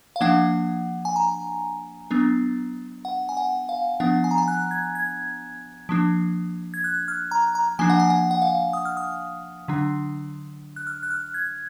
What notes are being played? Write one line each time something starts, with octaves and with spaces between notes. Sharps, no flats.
F5
F3 A#3 D4 F#5
G#5
A#5
F#3 B3 D4
F#5
G#5
F#5
F5
F3 B3 D4 F#5
G#5
A#5
G#5
F#6
G#6
G#6
F3 A#3 D4
G#6
F#6
F6
A#5
A#5
F3 A#3 D4 G#5
F#5
G#5
F#5
F#5
F5
D#6
F6
D#6
D3 F#3 D4
F#6
F6
F#6
F6
G#6